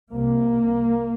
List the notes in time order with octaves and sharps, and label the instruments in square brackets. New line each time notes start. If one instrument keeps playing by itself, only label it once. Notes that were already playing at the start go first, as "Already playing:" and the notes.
[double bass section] C2 C3 A#3